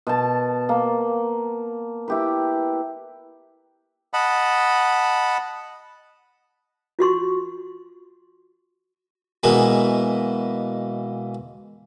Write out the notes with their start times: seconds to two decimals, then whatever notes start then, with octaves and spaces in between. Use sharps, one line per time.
0.07 B2 A5
0.69 A#3
2.08 E4 G4 B4
4.14 D#5 F#5 A5 B5
6.99 F4 F#4 C6 C#6
9.43 B2 E3 G#3 A#3